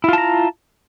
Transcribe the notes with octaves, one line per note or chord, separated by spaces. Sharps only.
E4 F4 A5 A#5